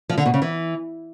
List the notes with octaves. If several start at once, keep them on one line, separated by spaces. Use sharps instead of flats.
F3
D3
B2
C#3
E3